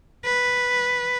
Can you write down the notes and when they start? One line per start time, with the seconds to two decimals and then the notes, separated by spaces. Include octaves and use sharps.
0.25 B4